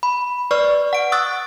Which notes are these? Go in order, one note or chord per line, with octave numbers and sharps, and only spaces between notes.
B5
B4 D5 C#6 F6
F#5 D7
C#6 D#6 E6 F#6 A6